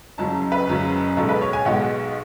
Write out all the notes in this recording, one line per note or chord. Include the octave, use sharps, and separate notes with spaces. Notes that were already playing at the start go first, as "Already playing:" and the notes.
F#1 F#2 C#3 F#3 A5
B4
F#1 F#2 C#3 F#3
B1 B2 G#3 A4
B4
C#5
G#5
B1 B2 G#3 F#5